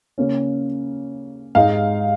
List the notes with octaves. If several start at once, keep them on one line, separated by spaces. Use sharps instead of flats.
C#3 A#3 C#4
G#2 G#3 D#4 F5